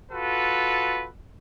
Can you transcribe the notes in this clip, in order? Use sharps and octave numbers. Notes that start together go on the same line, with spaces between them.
F4 F#4 A4 B4